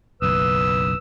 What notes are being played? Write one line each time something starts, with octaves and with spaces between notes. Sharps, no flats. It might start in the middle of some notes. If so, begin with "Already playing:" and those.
F#1 B1 B4 D#6 E6